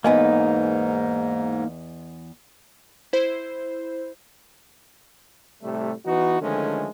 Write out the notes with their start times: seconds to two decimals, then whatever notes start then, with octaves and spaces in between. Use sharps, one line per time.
0.04 E2 G#2 A#3 B3 D#4 B4 D#5 G#5
3.13 E4 C5
5.62 A2 C3 G3 A3
6.05 E3 B3 D#4 F#4
6.40 D3 D#3 F3 G#3 A3 C#4